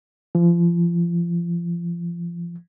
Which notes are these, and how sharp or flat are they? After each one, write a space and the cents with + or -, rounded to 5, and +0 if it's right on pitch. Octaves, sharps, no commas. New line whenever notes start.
F3 -30